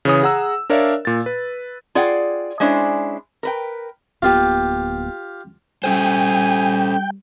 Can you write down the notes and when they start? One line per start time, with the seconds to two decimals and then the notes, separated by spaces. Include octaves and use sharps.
0.05 C#3 E3 C#5 D#6
0.23 G#4 F#5 A#5 E6
0.70 D4 A#4 C#5 D5 E5 F5
1.05 A#2 A6
1.26 B4
1.95 F4 G#4 D5 F#5 G5
2.60 G#3 C#4 D4 E4 C5 D5
3.43 A#4 B4 G5
4.22 D1 A#3 B3 F4 G4
5.84 G3 C#4 A4 C5 G5 G#5